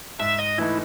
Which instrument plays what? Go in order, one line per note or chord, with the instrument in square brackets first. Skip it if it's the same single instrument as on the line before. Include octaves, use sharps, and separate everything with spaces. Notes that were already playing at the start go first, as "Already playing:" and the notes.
[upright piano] G#2 [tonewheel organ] E5
[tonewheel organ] D#5
[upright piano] E3 A3 D#4 [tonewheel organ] E4